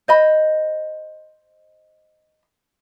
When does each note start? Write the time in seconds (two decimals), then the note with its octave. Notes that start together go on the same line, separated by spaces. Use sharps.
0.08 C5 D#5 B5